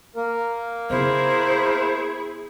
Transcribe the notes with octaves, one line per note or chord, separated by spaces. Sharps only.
A#3 A#4
C#3 B3 E4 G#4 C5